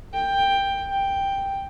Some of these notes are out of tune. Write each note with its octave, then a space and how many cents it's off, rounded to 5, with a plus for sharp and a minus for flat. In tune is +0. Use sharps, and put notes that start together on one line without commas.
G5 +10
G5 +5